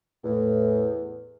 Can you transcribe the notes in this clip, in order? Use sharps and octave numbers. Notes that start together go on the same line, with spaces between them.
E2 A2